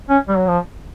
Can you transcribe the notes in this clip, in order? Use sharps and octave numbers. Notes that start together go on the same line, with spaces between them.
C#4
G3
F#3
F3